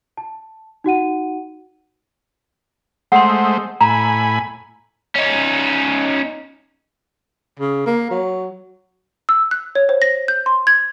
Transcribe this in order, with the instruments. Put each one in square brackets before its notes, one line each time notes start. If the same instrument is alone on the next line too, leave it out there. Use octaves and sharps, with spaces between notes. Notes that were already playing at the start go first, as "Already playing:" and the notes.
[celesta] A5
D#4 F#4 F#5 D#7
[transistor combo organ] G#3 A3 C5 [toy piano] F#5 C6
[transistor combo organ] A2 G#5 B5 [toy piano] A#5
[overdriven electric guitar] C#4 D#4
[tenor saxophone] C#3
A#3
F#3
[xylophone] E6
F#6
C#5
C5
A#6
G6
C6
G#6